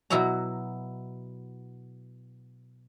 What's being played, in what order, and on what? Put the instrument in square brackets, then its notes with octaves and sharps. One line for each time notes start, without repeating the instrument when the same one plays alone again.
[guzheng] B2 F#3 E4 F#4 A#5